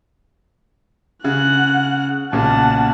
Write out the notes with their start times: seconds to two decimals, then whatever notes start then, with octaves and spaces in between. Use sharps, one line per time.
1.24 C#3 F#5 F#6
2.32 B1 A#2 C#3 F#5 A5